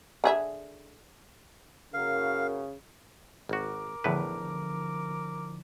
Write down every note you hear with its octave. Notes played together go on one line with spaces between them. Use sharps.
D3 G#4 E5
F#1 C#3 F#4 A#4 F5
G#1 F#4 A#4 D6
E2 A2 D3 F3 E4 B4